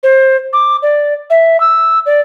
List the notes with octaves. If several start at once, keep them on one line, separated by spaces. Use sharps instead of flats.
C5
D6
D5
E5
E6
D5